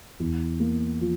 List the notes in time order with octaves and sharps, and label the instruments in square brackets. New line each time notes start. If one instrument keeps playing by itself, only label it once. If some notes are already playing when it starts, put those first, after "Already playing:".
[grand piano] E2
A#3
F3